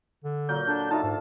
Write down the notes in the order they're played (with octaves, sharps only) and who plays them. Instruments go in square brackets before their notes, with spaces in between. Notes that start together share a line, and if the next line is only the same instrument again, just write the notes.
[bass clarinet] D3
[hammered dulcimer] A#2 F#3 A#4 [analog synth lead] G6
[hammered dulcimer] D3 [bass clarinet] D4
[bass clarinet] D#4 [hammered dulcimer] F4 E5 [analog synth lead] A5
[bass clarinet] G#2 [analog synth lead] A5